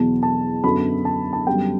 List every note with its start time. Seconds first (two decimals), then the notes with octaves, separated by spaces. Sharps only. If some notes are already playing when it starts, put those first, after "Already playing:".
Already playing: E2 B2 F#3 B3 A5
0.23 A5
0.64 F#2 D3 F#3 B3 B5
1.05 A5
1.33 A5
1.46 F#2 D3 G3 B3 G5